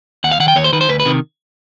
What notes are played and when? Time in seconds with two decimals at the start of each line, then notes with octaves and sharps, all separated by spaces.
0.24 D#2 F#5
0.32 F5
0.40 D#3 F#5
0.48 G5
0.56 D#2 C#5
0.64 C5
0.73 D#3 B4
0.81 C5
0.89 D2 B4
1.00 B4
1.06 C3 D#3